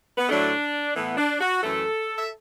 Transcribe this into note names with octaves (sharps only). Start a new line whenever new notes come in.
B3
A2 F#3 A3 D4
A2 E3 A3 B3
D4
F#4
F#2 E3 A3 A4
E5